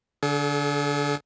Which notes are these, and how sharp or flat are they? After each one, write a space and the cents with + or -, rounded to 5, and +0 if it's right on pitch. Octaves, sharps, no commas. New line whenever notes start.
D3 -20 G#4 +45